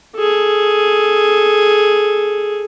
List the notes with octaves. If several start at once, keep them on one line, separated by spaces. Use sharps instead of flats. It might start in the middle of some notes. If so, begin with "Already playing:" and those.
G#4 A4